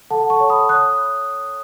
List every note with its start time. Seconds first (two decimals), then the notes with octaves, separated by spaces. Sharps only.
0.10 A4 F#5 A5
0.30 A5 C#6
0.40 C#5
0.50 B5 D#6
0.69 C#5 D#6 F#6